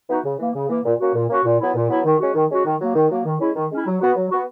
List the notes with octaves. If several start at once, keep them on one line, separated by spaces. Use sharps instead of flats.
E3 B3 D#4 F#4
C#3
E3 A#3
C#3
E3 A#3
A#2
A#3 C#4 F#4
A#2
A#3 C#4 F#4
A#2
F#3 B3 E4
A#2
F#3 B3 E4
D#3
G#3 C#4 F#4
D#3
G#3 C#4 F#4
D#3
F#3 A#3
D#3
F#3 A#3
D#3
G#3 C#4 E4
D#3
G#3 C#4 E4
F#3
B3 F#4
F#3
B3 F#4